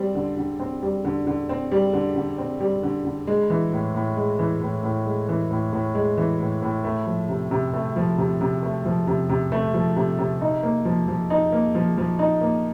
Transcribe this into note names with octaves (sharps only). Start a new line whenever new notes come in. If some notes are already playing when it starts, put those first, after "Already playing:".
Already playing: G3 C4
D3
D3
C4
G3
D3
D3
C4
G3
D3
D3
C4
G3
D3
D3
G#3
E3
A2
A2
G#3
E3
A2
A2
G#3
E3
A2
A2
G#3
E3
A2
A2
A3
F3
C3
C3
A3
F3
C3
C3
A3
F3
C3
C3
A3
F3
C3
C3
D#4
A#3
F3
F3
D#4
A#3
F3
F3
D#4
A#3